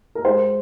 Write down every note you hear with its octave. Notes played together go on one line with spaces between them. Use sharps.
A#4
G#3 C5